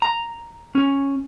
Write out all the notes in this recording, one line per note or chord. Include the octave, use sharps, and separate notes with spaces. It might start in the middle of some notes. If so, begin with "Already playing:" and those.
A#5
C#4